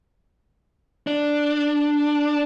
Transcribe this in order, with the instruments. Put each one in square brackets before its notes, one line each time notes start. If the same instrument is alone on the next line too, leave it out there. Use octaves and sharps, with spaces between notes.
[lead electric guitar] D4